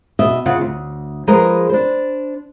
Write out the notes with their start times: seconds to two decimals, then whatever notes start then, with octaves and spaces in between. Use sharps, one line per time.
0.19 B2 D#5 E5
0.46 C#3 F4 F#5
0.61 D2
1.27 F3 G#3 G#4 A#4 B4
1.69 D4 C5